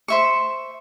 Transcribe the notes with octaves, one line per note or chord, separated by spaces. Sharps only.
C5 E5 C#6